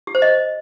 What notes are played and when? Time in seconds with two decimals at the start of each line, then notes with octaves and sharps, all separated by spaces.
0.07 G4
0.15 C5
0.22 D#5